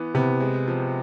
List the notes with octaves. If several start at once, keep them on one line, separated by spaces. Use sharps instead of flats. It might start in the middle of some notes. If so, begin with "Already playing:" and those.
Already playing: E3 B3
C3 B3
G#3
F3